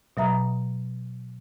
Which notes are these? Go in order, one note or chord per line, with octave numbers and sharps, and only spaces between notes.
B2 F#3 E5 A#5